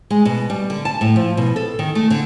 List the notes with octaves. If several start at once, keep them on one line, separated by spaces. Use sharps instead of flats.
G#3
B2
G3
D3
A5
A2
F3
B2
A4
D#3
A3
D3